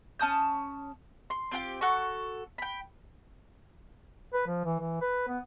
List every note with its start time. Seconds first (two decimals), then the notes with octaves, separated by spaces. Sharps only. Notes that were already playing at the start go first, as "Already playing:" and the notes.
0.19 C#4 A5 D#6 G6
1.30 C6
1.51 C4 F4 G4 G5
1.81 F#4 A4 C#6
2.58 G5 B5
4.33 B4
4.47 F3
4.65 E3
4.79 E3
5.01 B4
5.28 B3